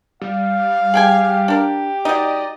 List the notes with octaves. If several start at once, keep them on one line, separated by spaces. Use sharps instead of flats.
G3 F5
G4 G#4 G5 G#5
D4 A#4
F#3 D#4 D5 D#5